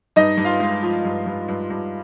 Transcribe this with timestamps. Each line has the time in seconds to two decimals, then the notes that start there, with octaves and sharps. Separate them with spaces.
0.16 G2 D#4 D#5
0.37 G2
0.45 F4 F5
0.60 G#3
0.83 F3
1.05 G2
1.26 G2
1.48 G2
1.70 G2